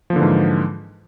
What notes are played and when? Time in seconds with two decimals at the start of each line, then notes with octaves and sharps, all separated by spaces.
0.10 F3
0.13 A#3
0.16 D3
0.19 E3
0.22 G#2